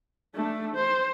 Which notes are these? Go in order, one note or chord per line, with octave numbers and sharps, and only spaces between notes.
A3 D4
C5